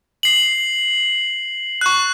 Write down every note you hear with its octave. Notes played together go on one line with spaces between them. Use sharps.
C7 F#7
C#6 F#6